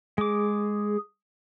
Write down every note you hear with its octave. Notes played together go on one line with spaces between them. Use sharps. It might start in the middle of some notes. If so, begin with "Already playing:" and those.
G#3 G#4 D6